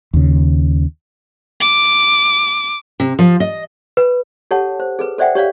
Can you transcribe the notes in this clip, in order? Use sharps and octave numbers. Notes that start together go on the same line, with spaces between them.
D#2 C#3
D6
C3
F3
D#5
B4
G4 A4 C#5 F#5 A5
C5
G#4 A4 B4
A4 C5 D5 E5 F#5 G5
G4 C#5 D5 F5